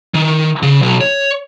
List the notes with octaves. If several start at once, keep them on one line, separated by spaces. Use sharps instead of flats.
D#3
C#3
B1
C#5